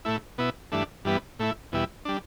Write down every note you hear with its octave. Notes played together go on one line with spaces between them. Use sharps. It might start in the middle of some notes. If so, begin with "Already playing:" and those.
A2 A3 E4
B2 B3 E4
G2 E3 A3 D4
G2 E3 G3 B3
A2 A3 E4
E2 B2 G3 E4
G3 D4